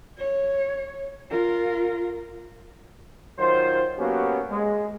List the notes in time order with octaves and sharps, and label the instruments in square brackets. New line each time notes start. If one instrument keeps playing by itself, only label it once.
[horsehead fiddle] C#5
F4 A#4
[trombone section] D#3 F#3 F4 C5
F#3 A#3 B3 C#4 F#4 G4
G#3